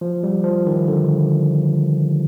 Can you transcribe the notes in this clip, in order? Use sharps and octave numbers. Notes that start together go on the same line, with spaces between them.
F3
G3
F3
D#3
D3